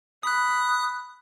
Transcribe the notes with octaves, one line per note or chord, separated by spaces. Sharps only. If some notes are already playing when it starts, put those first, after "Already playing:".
B5 D#6 F#6